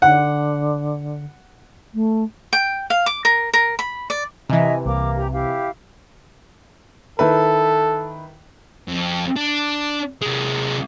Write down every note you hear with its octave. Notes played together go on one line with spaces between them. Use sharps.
D3 F#5
A3
G5
F5
D6
A#4
A#4
B5
D5
C3 E3 D#5 E5 G#5 A#5
C2 A#3 A#5 D6
G4 A#5
E4 G4 F5
D#3 E4 A4 B4
F2
D4
C3 G#3